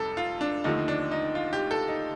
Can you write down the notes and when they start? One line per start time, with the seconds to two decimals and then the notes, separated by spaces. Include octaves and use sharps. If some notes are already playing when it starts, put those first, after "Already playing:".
Already playing: F2 C3 G3 A4
0.17 F4
0.41 D4
0.64 D#2 D3 F3 A3 D#4
0.88 D4
1.11 D#4
1.35 F4
1.53 G4
1.71 A4
1.88 D#4